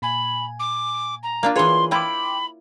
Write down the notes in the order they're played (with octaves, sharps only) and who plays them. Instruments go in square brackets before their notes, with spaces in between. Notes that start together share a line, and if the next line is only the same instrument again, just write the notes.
[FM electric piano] A#2 G#5 [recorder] B5
[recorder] D6
A#5
[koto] A#3 D4 F4
[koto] E3 C#5 [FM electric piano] F4 G#4 B4 [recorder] C6
[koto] E4 F4 [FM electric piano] G5 C6 D6 [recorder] B5